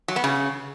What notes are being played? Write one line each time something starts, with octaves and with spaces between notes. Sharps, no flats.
F#3
B3
C#3